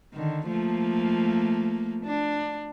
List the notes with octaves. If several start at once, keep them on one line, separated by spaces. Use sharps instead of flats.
D3 D#3
F3 A3 A#3
D4